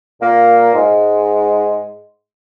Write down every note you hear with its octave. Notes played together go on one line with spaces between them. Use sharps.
A#2 A#3
G#2 G#3